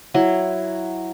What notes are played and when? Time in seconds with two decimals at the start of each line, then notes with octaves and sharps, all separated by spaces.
0.14 F#3 E4